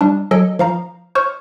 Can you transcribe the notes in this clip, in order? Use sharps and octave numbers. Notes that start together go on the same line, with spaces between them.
G3 D4
F#3 A4 D#5 G#5 D7
F3 F5 A#5
C5 C#5 C#6 F6